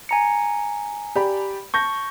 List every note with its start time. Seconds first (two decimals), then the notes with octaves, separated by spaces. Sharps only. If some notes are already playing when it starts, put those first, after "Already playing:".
0.09 G#5 A#5 C#7
1.16 G4 D5 B5
1.74 A5 C#6 G6 A#6